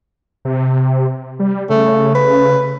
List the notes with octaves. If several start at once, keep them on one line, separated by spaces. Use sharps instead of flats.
C3
G3
C#3 A3
B4